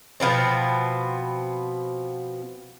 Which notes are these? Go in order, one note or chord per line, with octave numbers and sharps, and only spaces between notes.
B2 F3 B3 C4